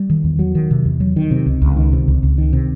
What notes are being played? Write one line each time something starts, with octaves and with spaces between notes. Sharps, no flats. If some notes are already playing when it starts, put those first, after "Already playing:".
Already playing: G3
D#3
E2
F#3
D#3
C3
E2
F#3
D#3
C3
C#2
C#2
D#3
C3
C#2
C#2
D#3
C3